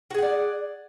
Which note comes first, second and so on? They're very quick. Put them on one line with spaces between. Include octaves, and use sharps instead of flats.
F#4 G#4 F#5 D5